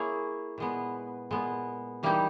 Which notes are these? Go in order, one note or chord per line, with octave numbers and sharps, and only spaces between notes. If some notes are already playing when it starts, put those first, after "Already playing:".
Already playing: A#3 E4 G#4 C#5
A#2 G#3 B3
A#2 G#3 B3
E3 G3 A#3 D#4 G4